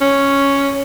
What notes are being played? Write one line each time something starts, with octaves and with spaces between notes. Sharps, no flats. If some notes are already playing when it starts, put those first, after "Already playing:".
C#4